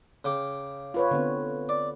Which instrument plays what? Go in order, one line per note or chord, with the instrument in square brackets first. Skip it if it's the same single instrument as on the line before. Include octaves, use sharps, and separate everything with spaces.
[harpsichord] C#3 G5 D6
[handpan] F4 B4 C#5
D3 B3 C4
[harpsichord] D5